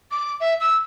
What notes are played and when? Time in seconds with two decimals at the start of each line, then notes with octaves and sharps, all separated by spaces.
0.11 D6
0.41 E5
0.61 E6